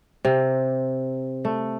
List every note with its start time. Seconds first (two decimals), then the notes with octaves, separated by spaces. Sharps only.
0.25 C3
1.45 A3